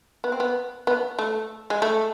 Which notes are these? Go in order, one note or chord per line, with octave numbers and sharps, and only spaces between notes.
B3
C4
B3
B3
A3
G#3
A3